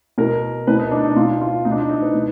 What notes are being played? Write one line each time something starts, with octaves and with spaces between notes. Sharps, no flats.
B2 A#4
B2 B4
D#4
D4
D#4
B2 F4
F4
B2 D#4
D4
D#4
D#4
B4
B2